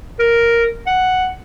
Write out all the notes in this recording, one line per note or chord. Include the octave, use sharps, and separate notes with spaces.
A#4
F#5